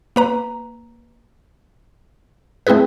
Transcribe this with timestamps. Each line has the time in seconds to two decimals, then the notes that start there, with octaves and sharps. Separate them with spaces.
0.16 A#3 B4 A#5
2.67 A3 C4 E4 G#4 B4